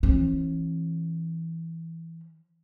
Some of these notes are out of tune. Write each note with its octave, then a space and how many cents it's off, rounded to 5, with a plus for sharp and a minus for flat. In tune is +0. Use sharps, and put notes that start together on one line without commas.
E3 +0 C#4 -45